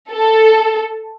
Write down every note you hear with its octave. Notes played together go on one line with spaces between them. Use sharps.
A4